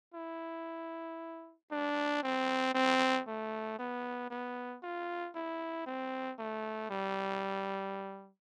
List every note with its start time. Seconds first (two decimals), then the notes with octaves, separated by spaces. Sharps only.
0.15 E4
1.72 D4
2.23 C4
2.75 C4
3.27 A3
3.79 B3
4.30 B3
4.83 F4
5.35 E4
5.87 C4
6.39 A3
6.90 G3